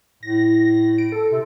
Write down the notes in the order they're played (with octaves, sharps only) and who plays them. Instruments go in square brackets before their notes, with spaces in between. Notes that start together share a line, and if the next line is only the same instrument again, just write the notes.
[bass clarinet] A2 [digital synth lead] A#6
[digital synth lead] D7
A4
[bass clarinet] C3